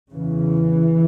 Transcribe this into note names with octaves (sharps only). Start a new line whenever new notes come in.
E2 C#3 E3